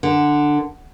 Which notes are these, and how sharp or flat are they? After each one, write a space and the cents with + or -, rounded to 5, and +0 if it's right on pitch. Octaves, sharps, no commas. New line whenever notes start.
D3 +10